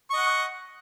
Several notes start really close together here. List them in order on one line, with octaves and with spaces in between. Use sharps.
C#6 D#5 F#5